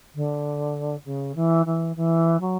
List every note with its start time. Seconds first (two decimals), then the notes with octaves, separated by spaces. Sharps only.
0.15 D3
1.05 C#3
1.35 E3
1.66 E3
1.96 E3
2.40 F#3